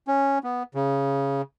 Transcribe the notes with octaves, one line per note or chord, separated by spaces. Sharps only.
C#4
B3
C#3